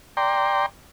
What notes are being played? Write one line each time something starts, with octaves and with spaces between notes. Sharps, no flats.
D5 G5 A#5 C6